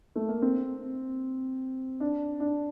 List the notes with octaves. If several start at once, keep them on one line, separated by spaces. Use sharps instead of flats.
A3
A#3
C4
D4
D4